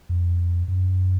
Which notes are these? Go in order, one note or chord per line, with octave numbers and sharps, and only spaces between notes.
F2
F#2